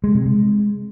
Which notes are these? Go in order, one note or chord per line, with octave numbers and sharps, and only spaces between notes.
G#3
C3
G#3